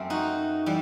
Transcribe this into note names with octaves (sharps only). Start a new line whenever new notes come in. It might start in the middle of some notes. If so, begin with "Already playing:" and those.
Already playing: F#2 A3 C4
D#4 F#4
E3 G3